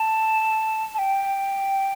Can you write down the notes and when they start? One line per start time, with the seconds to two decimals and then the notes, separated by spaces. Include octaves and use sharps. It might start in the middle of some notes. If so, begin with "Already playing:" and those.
Already playing: A5
0.94 A5
0.99 G5